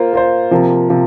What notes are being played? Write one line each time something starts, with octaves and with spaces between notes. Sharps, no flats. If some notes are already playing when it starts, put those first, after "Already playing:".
Already playing: A#3 F4 C5
A#3 F4 C5
C3 F3 A#3
C3 F3 A#3